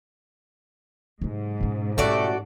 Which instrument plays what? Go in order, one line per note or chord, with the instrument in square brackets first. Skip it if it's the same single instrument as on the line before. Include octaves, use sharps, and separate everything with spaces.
[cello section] G#2 [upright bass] C3 F#3
[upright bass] B2 C#4
[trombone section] A1 G3 A3 [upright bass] B2 D#4 [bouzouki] F#4 A4 D5